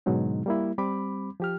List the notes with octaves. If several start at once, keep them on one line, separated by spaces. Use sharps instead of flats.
G#2 B2 D3 F#3 G#3 D#4
G3 A#3 E4
G3 C4 B5 D6
F3 G4 F6